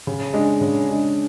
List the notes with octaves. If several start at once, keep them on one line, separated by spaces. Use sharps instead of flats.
C#3
G#3 D4
C#3
G#3 D4